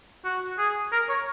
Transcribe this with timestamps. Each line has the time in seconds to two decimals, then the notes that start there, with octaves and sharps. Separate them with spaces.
0.25 F#4
0.58 G#4
0.92 A#4
1.09 C#5